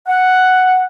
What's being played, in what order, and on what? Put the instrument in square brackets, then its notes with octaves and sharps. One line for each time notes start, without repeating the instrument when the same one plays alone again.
[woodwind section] F#5